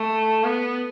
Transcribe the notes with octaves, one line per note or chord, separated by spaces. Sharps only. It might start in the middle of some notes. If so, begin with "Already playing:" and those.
Already playing: A3
B3